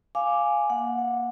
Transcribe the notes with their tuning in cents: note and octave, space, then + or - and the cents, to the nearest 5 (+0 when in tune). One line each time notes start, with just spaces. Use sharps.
F5 +0 G#5 +0 D6 +0
A#3 +15 F#5 -20